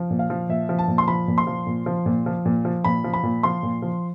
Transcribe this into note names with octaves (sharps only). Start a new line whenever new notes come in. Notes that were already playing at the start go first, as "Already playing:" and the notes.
Already playing: F3
A#2
F5
F3
A#2 E5
F3
A5
A#2
C6
F3 B5
A#2
C6
F3
A#2
F3
A#2
F3
A#2
F3
A#2 B5
F3
B5
A#2
F3 C6
A#2
F3